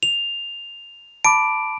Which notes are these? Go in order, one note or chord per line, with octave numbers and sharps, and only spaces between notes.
F7
A5 B5 D6 D7